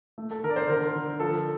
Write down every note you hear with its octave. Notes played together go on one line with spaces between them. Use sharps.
A3
A4
D3 A#4
D5
C5
D3 A#4
D3
F3 A4